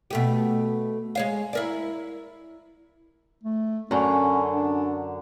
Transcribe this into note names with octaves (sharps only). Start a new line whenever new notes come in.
B2 A3 G4
G#3 C#5 F5
E4 A#4 D5
A3
F#2 D3 C#4
D4